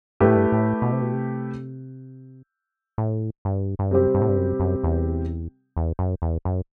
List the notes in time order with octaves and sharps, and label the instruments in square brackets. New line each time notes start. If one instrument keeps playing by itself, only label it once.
[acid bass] G2 [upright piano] A3 E4 G4 B4
[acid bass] A2
G2
A2
B2
C3
B2
C3
A2
G2
G2
[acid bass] F#2 [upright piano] C3 G3 C4 G4
[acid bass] G2
A2
G2
F#2
F#2
E2
E2
F#2
E2
F#2